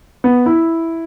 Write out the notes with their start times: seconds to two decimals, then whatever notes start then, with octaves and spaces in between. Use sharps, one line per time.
0.24 B3
0.46 E4